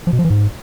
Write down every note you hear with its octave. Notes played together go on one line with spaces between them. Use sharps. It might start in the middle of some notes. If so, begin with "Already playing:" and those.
F3
B2
F3
E3
G#2